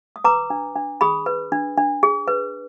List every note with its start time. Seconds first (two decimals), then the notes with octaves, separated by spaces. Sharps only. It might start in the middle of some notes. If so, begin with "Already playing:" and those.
0.16 D#6
0.24 B4 A#5 D6
0.50 D4
0.75 D4
1.01 G#4 B5 D#6
1.26 B4
1.52 D4
1.77 D4
2.03 G#4
2.28 B4